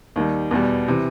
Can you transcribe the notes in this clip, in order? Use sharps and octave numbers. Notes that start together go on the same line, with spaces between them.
D#2 D#3 G3
E2 B2 G3
C3 E3